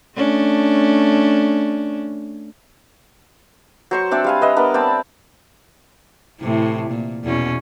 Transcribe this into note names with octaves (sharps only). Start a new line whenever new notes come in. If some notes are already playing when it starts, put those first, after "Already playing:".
A3 C#4 D4
F#3 C5 C#6
C4 D4 E5 D6
G3 F5 G#5
B4 D#5 E5
B3 D4 A#4
C4 D5 A5 B5
A2 C3 E3
A#2
E2 B2 C#4